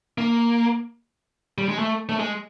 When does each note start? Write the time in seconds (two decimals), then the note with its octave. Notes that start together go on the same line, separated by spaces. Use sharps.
0.18 A#3
1.58 G3
1.69 G#3
1.79 A3
2.09 A3
2.19 G#3